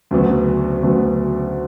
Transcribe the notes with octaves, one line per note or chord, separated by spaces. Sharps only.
D2 C#3 F#3 B3
D2 C#3 F#3 B3